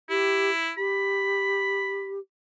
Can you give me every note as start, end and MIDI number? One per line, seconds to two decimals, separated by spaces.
0.10 0.71 64
0.10 0.51 67
0.77 2.19 67
0.77 2.14 83